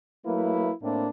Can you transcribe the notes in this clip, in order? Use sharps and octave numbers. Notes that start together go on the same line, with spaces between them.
F#3 A3 A#3 E4 B4
A2 A#3 C4 D4 E4